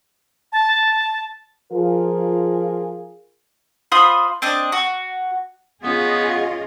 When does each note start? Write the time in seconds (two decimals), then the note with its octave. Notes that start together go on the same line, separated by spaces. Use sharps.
0.52 A5
1.73 F3 F4 G#4 A#4
3.92 F4 C5 B5 D#6
4.42 C4 D4 D#5
4.72 F#4
5.83 B3 C#4 F4 G#4 D#5